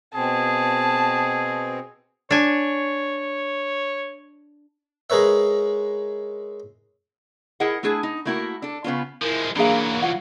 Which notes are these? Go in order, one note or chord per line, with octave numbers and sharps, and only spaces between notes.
B2 C4 G#4 A5
D4 C#5 G#5
G#3 G#4 A#4 B4 C#5 E5
E4 G#4 A#4 D#5 F#5
A3 D4 E4 G#4
D#4
A3 A#3 E4 F#4 A#4
D4 A4
C#3 B3 C#4 F4
F3 G#3 E4 A#4
E3 F#3 A#3 D4 G#4 F5 A#5
F4 F5 F#5